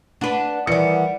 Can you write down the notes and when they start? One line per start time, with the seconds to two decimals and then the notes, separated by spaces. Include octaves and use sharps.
0.21 D4 B4 F#5
0.67 D#3 E3 G3 D5 C#7